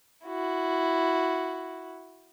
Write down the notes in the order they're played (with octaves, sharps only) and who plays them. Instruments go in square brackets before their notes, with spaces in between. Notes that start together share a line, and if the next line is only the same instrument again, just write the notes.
[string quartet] E4 F#4